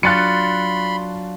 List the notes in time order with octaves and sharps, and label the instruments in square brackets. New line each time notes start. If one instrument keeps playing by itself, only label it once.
[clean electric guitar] F#3 D4 F4 [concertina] B5 C6 [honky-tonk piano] F#6 A6 C#7